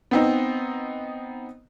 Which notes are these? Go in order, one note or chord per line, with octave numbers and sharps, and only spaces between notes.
B3 C4 D#4